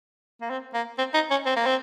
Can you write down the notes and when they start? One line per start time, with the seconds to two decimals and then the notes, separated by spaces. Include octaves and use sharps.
0.41 A#3
0.50 C4
0.74 A#3
0.98 C4
1.14 D#4
1.31 C#4
1.46 C4
1.56 A#3
1.66 C4